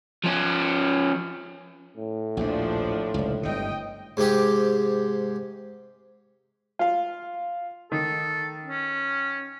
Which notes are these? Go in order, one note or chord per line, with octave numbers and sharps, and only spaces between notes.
F3 C#4
A2
A#1 D#2 A#2 F3 D4
F1 C#2
G1 D3 D#5 G5
G#2 C3 G#3 G4
F4 F5
D#3 A4
C#4